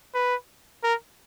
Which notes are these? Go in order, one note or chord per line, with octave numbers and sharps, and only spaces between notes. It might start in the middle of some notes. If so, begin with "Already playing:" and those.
B4
A#4